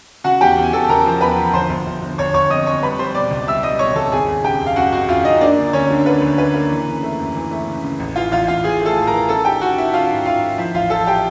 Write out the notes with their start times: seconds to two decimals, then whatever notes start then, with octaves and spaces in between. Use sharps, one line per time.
0.24 C#3 F#4 F#5
0.41 E2 G4 G5
0.57 E2
0.62 G#5
0.73 E2 A4 A5
0.84 A5
0.89 C#3 A#4 A#5
1.06 F3
1.21 E2 B4 B5
1.38 F3
1.53 G1 C5 C6
1.69 G1
1.86 G1
2.02 G1
2.18 G1 C#5 C#6
2.34 G1 C#5 C#6
2.50 F2 D#5 D#6
2.66 F2 C#5 C#6
2.82 G3 B4 B5
2.99 G3 C5 C6
3.15 B2 D5 D6
3.31 C#2
3.47 G3 E5 E6
3.63 G3 D#5 D#6
3.79 B2 C#5 C#6
3.95 C#2 A4 A5
4.12 G#1 G#4 G#5
4.28 G#1
4.44 C#3 G4 G5
4.61 F#2
4.67 F5
4.76 F#2 F#4 F#5
4.92 G#1 F#4 F#5
5.08 F#2 F4 F5
5.25 F#2 D#4 D#5
5.41 A#3 D4 D5
5.58 D3
5.73 D2 C#4 C#5
5.90 D3
6.06 A#3 B4
6.22 D2
6.38 A#3 B4
6.54 A#3
6.71 E3
6.87 C#3
7.03 A3
7.19 F#2
7.35 E3
7.51 A3
7.68 C#3
7.84 C#3
7.99 A1
8.16 E3 F4 F5
8.32 A1 F4 F5
8.48 A1 F4 F5
8.64 E3 G#4 G#5
8.81 A3 A4 A5
8.97 A2
9.07 A#4 A#5
9.13 E3
9.29 C#4 A4 A5
9.45 D#3 G4 G5
9.61 C#4 F#4 F#5
9.78 D#3 E4 E5
9.93 C#4 F4 F5
10.10 G#2
10.25 G#2 F4 F5
10.43 D#3
10.58 F3 E4 E5
10.74 A1 F4 F5
10.90 F3 A4 A5
11.07 G4 G5